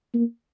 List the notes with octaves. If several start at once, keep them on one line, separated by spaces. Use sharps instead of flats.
A#3